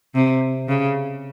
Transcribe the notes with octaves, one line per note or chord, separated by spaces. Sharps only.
C3
C#3